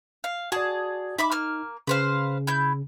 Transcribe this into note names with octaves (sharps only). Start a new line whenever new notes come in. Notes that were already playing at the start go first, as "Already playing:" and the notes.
F5
F#4 G#4 D5 A5
D#4 E5 B5 D6
A#3 F6
C#3 B4 C5 F5
E4 G6